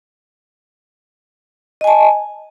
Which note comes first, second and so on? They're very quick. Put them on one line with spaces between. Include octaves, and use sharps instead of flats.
D#5 G#5 A5